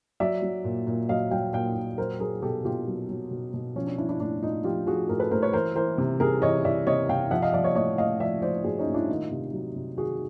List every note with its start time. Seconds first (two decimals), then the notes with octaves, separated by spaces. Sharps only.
0.20 F#3 D5 E5
0.42 F#3
0.64 A#2
0.87 A#2
1.09 F#3 D#5 F5
1.31 F#3 F5 G5
1.53 A#2 F5 G5
1.75 A#2
1.98 F#3 A#4 C5
2.20 F#3 G#4 A#4
2.42 B2 G4 A4
2.65 B2 F4 G4
2.87 F#3
3.09 F#3
3.31 B2
3.54 B2
3.76 F3 C#4
3.87 D4
3.98 F3 D4 E4
4.09 D4 E4
4.20 A2 D4 E4
4.42 A2 D#4 F4
4.64 F3 F4 G4
4.87 F3 F#4 G#4
5.09 A2 G#4 A#4
5.20 A4 B4
5.31 A2 A#4 C5
5.42 B4 C#5
5.53 E3 A#4 C5
5.75 E3 A#4 C5
5.98 C3
6.20 C3 G#4 A#4
6.42 E3 C#5 D#5
6.64 E3 D5 E5
6.87 C3 C#5 D#5
7.09 C3 F5 G5
7.31 F3 E5 F#5
7.42 D#5 F5
7.53 F3 D5 E5
7.64 C#5 D#5
7.75 A2 C#5 D#5
7.98 A2 D#5 F5
8.20 F3 D5 E5
8.42 F3 C5 D5
8.64 A2 F#4 G#4
8.79 C#4 D#4
8.87 A2
8.94 D4 E4
9.09 D#3 D#4 F4
9.31 C3
9.53 F#3
9.76 C3
9.97 D#3 F#4 G#4